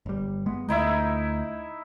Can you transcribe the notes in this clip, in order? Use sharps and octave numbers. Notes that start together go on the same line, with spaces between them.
G1 G3
G#3 B3
D2 D#4 E4 E5